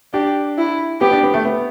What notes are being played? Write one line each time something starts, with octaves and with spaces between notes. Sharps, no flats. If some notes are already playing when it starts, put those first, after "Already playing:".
D4 G4
E4
B3 G4
D4
B3
A3
B3